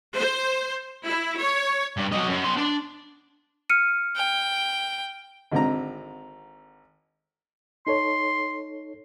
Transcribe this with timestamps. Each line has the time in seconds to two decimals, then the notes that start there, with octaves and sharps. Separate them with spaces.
0.14 C5
1.06 E4
1.39 C#5
1.97 G2
2.12 F#3 D#5
2.28 F#2
2.44 B3 C6
2.56 D4
3.70 F6 C#7 D#7
4.16 G5
5.52 G#1 D3 C4 A#5
7.87 D#4 A4 C#5 C6